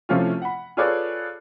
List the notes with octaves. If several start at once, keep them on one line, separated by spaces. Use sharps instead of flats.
C3 F3 A3 C#4 E4 F4
F#5 B5
F4 G#4 A4 B4 C#5 D5